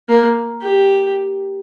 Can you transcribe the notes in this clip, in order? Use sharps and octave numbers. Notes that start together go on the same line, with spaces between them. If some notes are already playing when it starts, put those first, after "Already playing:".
A#3
G4